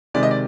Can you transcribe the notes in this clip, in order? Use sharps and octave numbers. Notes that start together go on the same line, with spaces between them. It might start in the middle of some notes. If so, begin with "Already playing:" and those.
C3 D#3 G#3 D5
D#5
D5